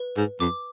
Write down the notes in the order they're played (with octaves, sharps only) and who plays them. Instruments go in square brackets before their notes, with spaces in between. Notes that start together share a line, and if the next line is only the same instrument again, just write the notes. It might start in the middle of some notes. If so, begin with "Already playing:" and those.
Already playing: [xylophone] B4
[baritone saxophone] G#2
[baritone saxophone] F2 [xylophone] D6